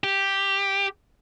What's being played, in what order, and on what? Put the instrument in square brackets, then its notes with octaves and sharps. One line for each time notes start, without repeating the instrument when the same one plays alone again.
[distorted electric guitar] G4